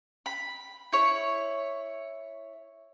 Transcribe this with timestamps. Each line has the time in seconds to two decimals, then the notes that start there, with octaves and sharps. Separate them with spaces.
0.26 B5
0.93 E4 C#5